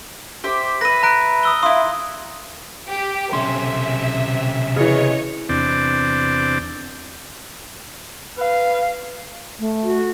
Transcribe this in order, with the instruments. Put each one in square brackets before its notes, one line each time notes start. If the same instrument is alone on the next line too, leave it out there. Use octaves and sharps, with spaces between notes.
[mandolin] G4 C5 E5
[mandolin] B4 E5 [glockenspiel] A#6 D#7
[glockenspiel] A#5 F#6 D7
D#6 E6 G7
[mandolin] E4 F4 [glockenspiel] C6 D#6
[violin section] G4
[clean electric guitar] B1 A4 C6 [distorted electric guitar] C3 C#4 [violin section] E5
[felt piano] C#3 E3 [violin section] C#5 D#5 C#7
[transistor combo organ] E2 C3 C4 D4 D5
[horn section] B4 [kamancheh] F5
[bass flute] A3
[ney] F#4